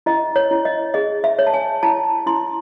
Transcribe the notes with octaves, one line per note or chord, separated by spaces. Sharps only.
E4 D#5
C#5
E4
D#5
G#4 D#5
E5
C#5
A5
G#5
E4 A5
E4 C6